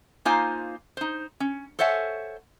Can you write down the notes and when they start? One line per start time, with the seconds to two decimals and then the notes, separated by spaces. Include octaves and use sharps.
0.25 A#3 D#4 F4 C5 F5 G#5
0.97 D#4 C5
1.40 C#4
1.79 A4 C5 C#5 E5 F#5 G#5